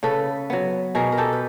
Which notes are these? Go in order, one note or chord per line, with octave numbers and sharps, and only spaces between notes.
C#3 A4 B4
F#3 B3
B2 G#4 A#4
A#4
G4 A4
B4